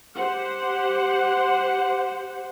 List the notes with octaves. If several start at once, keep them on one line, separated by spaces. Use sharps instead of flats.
G4 C5 F#5